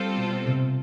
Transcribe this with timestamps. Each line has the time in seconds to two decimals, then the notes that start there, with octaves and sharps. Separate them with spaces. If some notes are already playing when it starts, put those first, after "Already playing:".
Already playing: G3 C4 F4 A4 C5
0.16 B2
0.46 C3